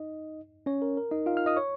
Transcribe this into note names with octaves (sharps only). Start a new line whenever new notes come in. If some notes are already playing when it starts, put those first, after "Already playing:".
Already playing: D#4 D#5
C#4 C#5
A#4
A#4
D#4 D#5
F4 F5
F5 F6
D#5 D#6
C#5 C#6